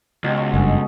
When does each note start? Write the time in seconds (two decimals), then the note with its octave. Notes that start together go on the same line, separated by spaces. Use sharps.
0.24 C#2 B2 G4
0.37 F#4
0.54 F#1 G2 A4 D#5 G#5